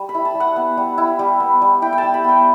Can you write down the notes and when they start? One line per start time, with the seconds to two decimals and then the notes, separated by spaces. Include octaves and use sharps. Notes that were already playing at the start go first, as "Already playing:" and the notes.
Already playing: G3
0.09 B5
0.15 E4
0.25 A5
0.35 G3
0.40 F#5
0.56 B3
0.77 G3
0.98 E4
1.19 G3
1.40 B3
1.62 G3
1.82 E4 G5
1.93 G5
1.98 A5
2.03 G3
2.14 B5
2.24 B3 G5